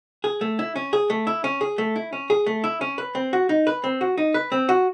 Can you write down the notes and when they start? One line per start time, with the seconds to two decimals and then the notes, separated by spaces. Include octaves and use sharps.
0.24 G#4
0.41 A3
0.59 E4
0.76 C#4
0.93 G#4
1.10 A3
1.27 E4
1.44 C#4
1.61 G#4
1.78 A3
1.96 E4
2.13 C#4
2.30 G#4
2.46 A3
2.64 E4
2.81 C#4
2.98 B4
3.15 C4
3.33 F#4
3.49 D#4
3.67 B4
3.84 C4
4.01 F#4
4.18 D#4
4.34 B4
4.52 C4
4.69 F#4